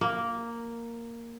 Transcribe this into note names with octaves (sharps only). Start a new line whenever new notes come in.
A#3